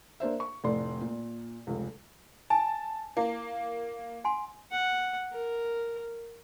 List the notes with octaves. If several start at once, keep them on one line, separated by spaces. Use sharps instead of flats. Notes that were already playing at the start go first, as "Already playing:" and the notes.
A#3 D4 C5 E5
C#6
F1 A2 D5 C6
A#2
F1 C#2
G#5 A5
A#3 E4
F#5 G#5 C6
F#5
A#4